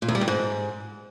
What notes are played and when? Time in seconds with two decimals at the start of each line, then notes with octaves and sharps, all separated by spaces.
0.02 A#2
0.08 E2
0.15 G3
0.21 G2
0.28 G#2